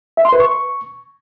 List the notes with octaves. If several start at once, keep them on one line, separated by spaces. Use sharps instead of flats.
E5
C6
B4
C#6